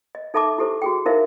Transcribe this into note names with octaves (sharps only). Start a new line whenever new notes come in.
D#5
D#4 A4 E5 A5 A#5 D6
E4 G4 A4 C5
F#4 G#4 G5
D#4 E4 A#4 C5 E5 F5